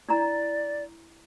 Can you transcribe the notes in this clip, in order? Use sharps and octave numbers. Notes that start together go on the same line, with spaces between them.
D4 E4 D5 A#5